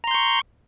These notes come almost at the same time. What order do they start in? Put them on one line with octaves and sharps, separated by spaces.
A#5 C6 G6 C#6